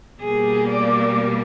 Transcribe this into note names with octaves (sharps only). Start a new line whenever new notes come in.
B2 G3 A#3 G#4
D5